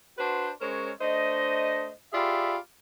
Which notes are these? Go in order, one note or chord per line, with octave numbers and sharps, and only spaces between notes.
D4 F#4 B4 C5
G#3 C#4 A#4 C5 C#5
A3 D4 C5 D#5
F4 G4 G#4 D5 E5 B5